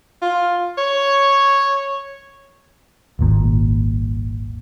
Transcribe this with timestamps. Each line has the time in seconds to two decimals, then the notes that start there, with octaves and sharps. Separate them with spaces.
0.22 F4
0.78 C#5
3.19 D#1 G#1 A#2